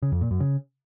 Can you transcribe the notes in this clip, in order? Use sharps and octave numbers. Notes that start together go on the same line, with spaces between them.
C#3
F2
A#2
F#2
C#3